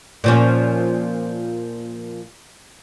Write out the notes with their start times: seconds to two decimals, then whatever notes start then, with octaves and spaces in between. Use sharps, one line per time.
0.24 A#2 F3 C#4